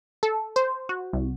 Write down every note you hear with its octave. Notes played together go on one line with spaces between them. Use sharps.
A4
C5
F#4
C2